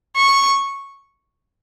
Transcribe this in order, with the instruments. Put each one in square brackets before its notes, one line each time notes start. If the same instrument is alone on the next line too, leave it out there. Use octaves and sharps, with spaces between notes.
[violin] C#6